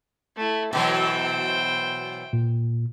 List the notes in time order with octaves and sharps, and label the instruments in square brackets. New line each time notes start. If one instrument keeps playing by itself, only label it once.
[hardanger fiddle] A3 E4
[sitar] B2 E3 F#3 [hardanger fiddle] C5 G5
[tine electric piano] A#2